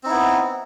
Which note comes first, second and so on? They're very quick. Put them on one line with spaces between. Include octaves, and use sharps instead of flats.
C4 D#4 E4 B3